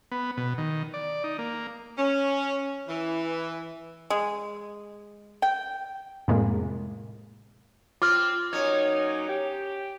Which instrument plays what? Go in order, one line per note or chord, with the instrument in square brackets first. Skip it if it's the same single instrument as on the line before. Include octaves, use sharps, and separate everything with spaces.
[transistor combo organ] B3
B2
D#3
D5
D#4
A#3
[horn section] C#4
E3
[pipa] G#3
G5
[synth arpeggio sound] F2 A2 C3 G#3 A#3
[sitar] C4 [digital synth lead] F4 [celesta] D6 F6
[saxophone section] F#3 A#3 D#4 [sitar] C#4 [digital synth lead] C#5
[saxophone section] G4